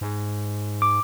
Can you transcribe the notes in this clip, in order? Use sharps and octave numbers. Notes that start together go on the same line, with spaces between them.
G#2
D6